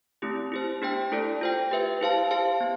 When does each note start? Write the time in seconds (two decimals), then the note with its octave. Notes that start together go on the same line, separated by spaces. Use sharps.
0.22 A3 C4 E4 G4
0.52 E4 G4 C5
0.82 B3 D4 G4 C5 G5
1.12 A3 E4 A4 D5
1.41 F4 C5 G5
1.71 G4 B4 E5
2.01 E4 G4 C5 F5 A5
2.31 G4 C5 F5 A5
2.61 B3